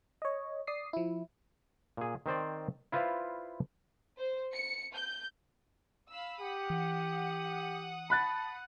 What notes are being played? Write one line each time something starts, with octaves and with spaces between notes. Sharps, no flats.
C#5 D#5
D5 D#6 C7
F3 E4
A#2 G#4
D#3 C4 C5 D5
E4 F4 B4 C5 D5 F5
C5
C#7
G6
F5 B5 E6
G4 F#5 D#6
E3
A5 B5 F#6 A6